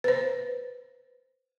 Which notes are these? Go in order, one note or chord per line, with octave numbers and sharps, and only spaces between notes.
B4 C5